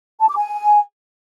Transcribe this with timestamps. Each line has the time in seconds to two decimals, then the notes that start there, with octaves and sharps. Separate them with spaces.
0.20 A5
0.28 D6
0.37 G#5